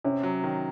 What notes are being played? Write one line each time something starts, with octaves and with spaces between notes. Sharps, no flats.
C3 C#4
F#3
D#3